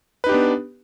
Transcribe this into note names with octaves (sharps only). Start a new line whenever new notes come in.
B3 D4 D#4 G4 B4